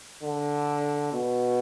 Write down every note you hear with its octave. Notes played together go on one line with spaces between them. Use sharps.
D3
B2